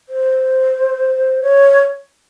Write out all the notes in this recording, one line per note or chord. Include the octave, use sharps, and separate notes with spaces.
C5
C#5